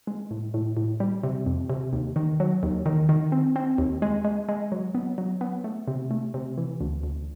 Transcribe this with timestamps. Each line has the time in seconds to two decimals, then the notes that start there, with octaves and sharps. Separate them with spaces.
0.07 G#3
0.31 A2
0.54 A2
0.77 A2
1.00 G3
1.23 C3
1.46 F2
1.70 C3
1.93 D#2
2.16 D#3
2.40 F#3
2.63 D#2
2.86 D#3
3.09 D#3
3.32 C4
3.56 C4
3.78 D#2
4.02 G#3
4.25 G#3
4.49 G#3
4.72 F#3
4.95 B3
5.18 F#3
5.41 B3
5.64 A3
5.88 C3
6.11 A3
6.34 C3
6.58 E3
6.80 D2
7.03 D2